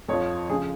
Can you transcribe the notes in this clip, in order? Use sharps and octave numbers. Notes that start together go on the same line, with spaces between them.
F2 F3 C#5
C#3 F3 G#4